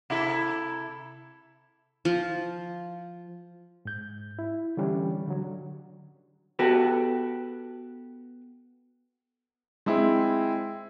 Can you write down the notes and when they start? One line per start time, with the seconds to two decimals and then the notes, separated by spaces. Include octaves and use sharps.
0.10 C3 E4 A4
2.05 F3
3.85 G#2 G6
4.39 E4
4.77 D3 E3 G3 C#4 D4
5.28 D3 F#3
6.59 B3 F#4 G4 A4 B4
9.86 G#3 C4 E4